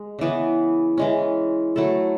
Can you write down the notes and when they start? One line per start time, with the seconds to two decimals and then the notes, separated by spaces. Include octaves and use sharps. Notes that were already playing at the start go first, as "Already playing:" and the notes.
Already playing: G#3
0.19 C#3 E3 B3
0.98 E3 G#3 C#4
1.76 F#3 A3 E4 A4